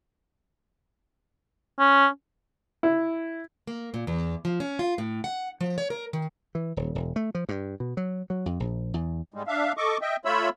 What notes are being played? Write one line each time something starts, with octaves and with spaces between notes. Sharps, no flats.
C#4
E4
A#3
A#2
E2
F3
C#4
F4
A2
F#5
F3
C#5
A#4
D#3
E3
D#1
E1
A3
F3
G2
B2
F#3
F#3
F2
A#1
E2
G#2 G3 G#3
D4 E5 F5
A4 D#5 C#6 D6
D#5 E5 G5
A3 F4 C#5 E5 B5 E6